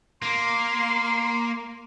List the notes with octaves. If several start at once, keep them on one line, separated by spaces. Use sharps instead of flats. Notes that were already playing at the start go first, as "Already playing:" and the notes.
A#3 C6